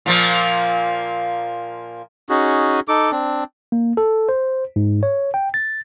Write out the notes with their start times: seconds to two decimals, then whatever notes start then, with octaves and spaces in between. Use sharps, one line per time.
0.06 A#2 F3 A#3
2.29 C#4 D#4 F#4 G#4
2.88 D#4 A4 D6
3.11 C4 D4
3.72 A#3
3.97 A4
4.29 C5
4.76 G#2
5.03 C#5
5.34 G5
5.54 A6